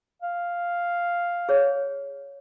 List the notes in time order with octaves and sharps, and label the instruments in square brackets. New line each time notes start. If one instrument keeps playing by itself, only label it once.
[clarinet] F5
[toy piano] G#4 C#5